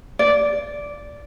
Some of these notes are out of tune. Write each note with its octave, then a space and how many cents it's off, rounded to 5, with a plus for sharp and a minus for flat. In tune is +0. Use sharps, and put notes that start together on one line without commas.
D5 -10